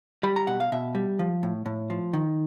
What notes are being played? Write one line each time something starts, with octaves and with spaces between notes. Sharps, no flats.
G3 B5
A#5
B2 F#5
F5
B2 E5
G3
F3
A2
A2
F3
D#3